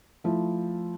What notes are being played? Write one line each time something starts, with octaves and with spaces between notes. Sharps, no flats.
F3 A3 E4